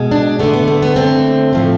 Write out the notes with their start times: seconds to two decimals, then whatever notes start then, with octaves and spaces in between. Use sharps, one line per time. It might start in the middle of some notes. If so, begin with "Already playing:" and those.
Already playing: B2 G#3
0.11 D4
0.39 D3 A3 B3
0.53 B3
0.68 A3
0.82 B3
0.96 D3 A3 C4
1.53 A2 F3 A3